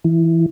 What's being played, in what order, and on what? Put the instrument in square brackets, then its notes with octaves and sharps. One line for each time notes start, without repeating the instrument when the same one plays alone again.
[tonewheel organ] E3